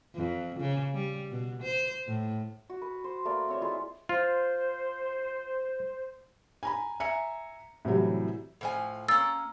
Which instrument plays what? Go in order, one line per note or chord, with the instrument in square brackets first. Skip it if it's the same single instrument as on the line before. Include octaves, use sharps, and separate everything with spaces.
[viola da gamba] F2
C#3
G3
B2
C5
A2
[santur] F#4
B4
C5
A3 A#3 D5 B5
C4 C#5 E5
G#3 E4 F4 B4
[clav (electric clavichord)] F4 [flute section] C5
[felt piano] G#5 A#5 B5
E5 G#5 A#5 C#7
A2 C3 E3 F#3 G3
[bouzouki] A2 F3 G#5
[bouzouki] A#3 C#4 [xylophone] E6 A6